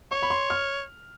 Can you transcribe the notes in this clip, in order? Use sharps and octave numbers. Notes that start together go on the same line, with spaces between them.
C#5 C#6
B5
C6
F6